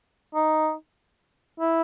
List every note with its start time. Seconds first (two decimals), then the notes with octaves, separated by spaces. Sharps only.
0.35 D#4
1.60 E4